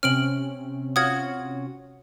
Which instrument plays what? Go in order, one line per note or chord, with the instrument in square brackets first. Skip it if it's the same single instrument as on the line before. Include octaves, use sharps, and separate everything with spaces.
[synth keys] C3 C4 C#4 [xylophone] F6 D7 F#7
[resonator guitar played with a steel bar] F4 F#4 C#5 [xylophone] D#6 G#6